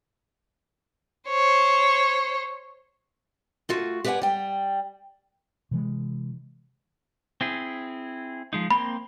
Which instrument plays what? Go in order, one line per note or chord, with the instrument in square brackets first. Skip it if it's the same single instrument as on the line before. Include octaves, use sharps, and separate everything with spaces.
[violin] C5 C#5
[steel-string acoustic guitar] A3 F4 F#4
G4 B4 D5 D#5 F#5 G#5
G3 G5
[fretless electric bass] C3 E3 G#3
[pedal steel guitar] C4 E4 G#4
F3 G#3 D#4
[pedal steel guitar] A#3 C4 C6 [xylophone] B5